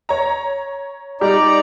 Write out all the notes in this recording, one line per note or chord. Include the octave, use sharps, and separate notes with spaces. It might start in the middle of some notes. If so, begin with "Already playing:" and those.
C#5 A#5
G3 D#4 G4 D5 A#5